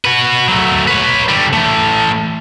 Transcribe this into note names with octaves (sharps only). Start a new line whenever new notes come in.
F#4 B4
F#3 A3
B4 C#5
D3 G3
E3 A3